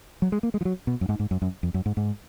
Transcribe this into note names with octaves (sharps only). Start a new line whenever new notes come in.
F#3
G#3
A#3
G#3
F3
F#3
B2
F#2
G#2
G#2
F#2
F#2
F2
F#2
G#2
G#2